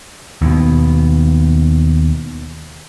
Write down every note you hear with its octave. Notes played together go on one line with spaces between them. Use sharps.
D#2 B2